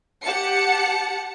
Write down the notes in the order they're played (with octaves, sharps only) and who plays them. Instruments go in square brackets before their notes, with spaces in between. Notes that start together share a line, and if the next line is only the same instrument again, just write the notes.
[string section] G4 F#5 A5 C#7